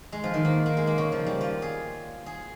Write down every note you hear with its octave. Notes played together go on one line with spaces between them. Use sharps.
G#3
F3
D#3
A#3
A#3
G#3
A#3
C#3
F3
G3
F4
G#4
G#4